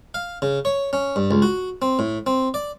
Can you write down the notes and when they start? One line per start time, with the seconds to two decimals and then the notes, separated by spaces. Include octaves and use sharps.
0.14 F5
0.42 C#3
0.65 C#5
0.93 C#4
1.16 G2
1.31 C#2
1.42 F#4
1.82 C4
1.99 A2
2.27 C4
2.54 D5